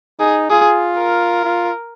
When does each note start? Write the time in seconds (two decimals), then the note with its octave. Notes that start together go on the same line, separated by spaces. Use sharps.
0.20 D#4 G#4
0.50 F4 G#4
0.98 A#4
1.44 F4